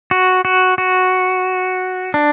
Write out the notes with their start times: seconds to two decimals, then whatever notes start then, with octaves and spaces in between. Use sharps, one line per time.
0.11 F#4
0.45 F#4
0.78 F#4
2.14 D4